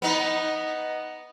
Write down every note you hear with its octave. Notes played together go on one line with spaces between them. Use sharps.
B3 D#4